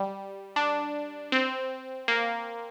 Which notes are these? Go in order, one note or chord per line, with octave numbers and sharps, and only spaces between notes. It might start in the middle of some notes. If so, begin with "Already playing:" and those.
Already playing: G3
D4
C4
A#3